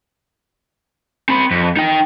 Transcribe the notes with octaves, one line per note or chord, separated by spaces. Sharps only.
C4 B5
F2
D#4 G5